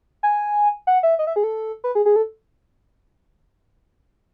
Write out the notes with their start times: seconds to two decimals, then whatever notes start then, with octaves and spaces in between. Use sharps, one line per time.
0.23 G#5
0.87 F#5
1.03 E5
1.19 D#5
1.27 E5
1.36 G#4
1.44 A4
1.84 B4
1.95 G#4
2.06 G#4
2.16 A4